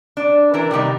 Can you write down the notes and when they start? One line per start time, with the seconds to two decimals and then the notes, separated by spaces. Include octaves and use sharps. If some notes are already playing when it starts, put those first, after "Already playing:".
0.17 D4
0.54 E3 D4 A#4
0.71 C3 D#3 G3 D#4